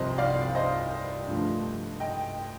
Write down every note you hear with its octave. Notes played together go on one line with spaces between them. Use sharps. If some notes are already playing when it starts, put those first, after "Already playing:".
Already playing: C2 C3 F3 C5 D#5
D5 F5
C5 D#5
G2 D3 F3 A3
D#5 G5